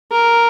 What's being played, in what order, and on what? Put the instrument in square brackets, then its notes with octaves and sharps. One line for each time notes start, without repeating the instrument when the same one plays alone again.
[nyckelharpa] A#4